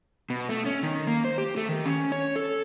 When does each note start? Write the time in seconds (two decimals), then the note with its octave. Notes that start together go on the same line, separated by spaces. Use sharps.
0.30 B2
0.49 A3
0.66 C#4
0.83 D#3
1.07 A#3
1.25 C5
1.38 G4
1.57 A3
1.69 D#3
1.85 C#4
2.12 C#5
2.36 A4